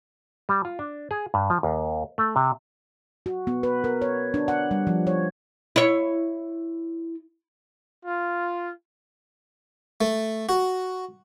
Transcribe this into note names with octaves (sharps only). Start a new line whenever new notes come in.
G3
F4
D4
G#4
G2
F3
D#2
A3
C3
F#4
B3
B4
A#4
C#5
D4
F#5
G3
F3
C#5
E4 C#5
F4
A3
F#4